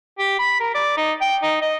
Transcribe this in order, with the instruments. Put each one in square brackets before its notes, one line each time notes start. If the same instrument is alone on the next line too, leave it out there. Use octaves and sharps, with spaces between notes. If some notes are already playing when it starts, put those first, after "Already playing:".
[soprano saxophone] G4
B5
A#4
D5
D#4
G5
D#4
D#5